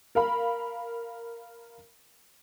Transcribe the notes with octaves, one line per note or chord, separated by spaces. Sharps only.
A#4 F5 B5